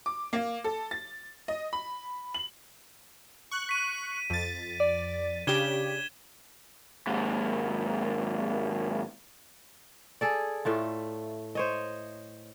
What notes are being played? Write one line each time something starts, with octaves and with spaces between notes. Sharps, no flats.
D6
A#3
A4
A6
D#5
B5
F#7
C#6 F#6
B6 D#7
F2 A6
D5
C#3 D4 G4 G#6 E7 G7
D#2 G#2
G#4 A4 D5
A2 A3 F4
C5 C#5 D#5